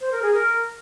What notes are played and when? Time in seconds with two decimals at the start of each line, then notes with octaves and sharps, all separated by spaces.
0.01 C5
0.12 A#4
0.22 G#4
0.34 A#4